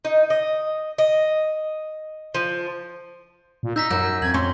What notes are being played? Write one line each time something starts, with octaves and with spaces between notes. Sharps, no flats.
D#4
D#5
D#5
F3
A#2
D#4 E6 G6 A#6 B6
F#2 F#3 A#5 G6
F2 G#6 F#7
C#4 C6